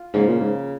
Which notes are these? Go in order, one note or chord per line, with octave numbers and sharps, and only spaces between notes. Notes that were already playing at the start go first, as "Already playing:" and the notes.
Already playing: F4
G#2 C#3 F3 A#3
A#2
G#2